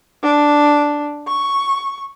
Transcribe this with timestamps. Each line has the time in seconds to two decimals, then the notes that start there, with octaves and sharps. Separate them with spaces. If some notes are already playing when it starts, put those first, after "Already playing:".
0.23 D4
1.28 C#6